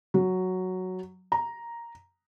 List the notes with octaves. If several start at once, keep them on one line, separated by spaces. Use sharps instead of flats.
F#3
A#5